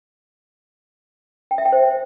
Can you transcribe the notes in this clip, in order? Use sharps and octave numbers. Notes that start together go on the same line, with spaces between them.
G5
E5
G5
C5